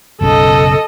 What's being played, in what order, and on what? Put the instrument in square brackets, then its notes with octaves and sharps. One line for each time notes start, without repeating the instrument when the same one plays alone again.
[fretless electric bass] F#1 B1 C#3 [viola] A4 D#5